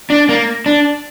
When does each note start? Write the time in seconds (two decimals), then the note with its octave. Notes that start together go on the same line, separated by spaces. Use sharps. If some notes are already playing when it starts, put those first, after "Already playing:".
0.10 D4
0.29 A#3
0.66 D4